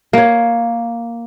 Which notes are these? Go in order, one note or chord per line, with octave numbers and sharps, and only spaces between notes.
A#3 C#5